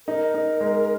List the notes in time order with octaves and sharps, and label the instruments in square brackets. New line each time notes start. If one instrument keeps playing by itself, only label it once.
[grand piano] D#4 [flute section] A#4
[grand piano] D#4
G#3